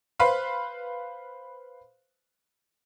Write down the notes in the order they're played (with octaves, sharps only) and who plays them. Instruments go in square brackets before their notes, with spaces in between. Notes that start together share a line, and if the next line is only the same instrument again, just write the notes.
[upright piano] B4 C5 F5 B5 C6